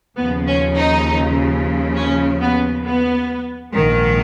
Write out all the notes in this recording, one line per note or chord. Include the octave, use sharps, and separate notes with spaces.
D#2 C#3 F3 B3
C#4
D#4
C#4
B3
B3
A#1 G#2 D#3